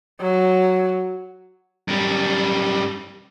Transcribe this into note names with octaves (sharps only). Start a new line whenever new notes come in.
F#3
F#2 G3